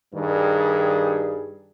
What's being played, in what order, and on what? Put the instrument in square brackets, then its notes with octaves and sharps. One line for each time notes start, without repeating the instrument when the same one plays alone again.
[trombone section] G2 D#3 G3 G#4